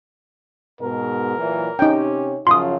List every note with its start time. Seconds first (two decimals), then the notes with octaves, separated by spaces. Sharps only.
0.81 G#2 B2 A#4
1.38 A#2 E3 F#3
1.79 C3 C#4 D#4 G4 G5
2.47 F#2 C#3 F3 F4 C6 D#6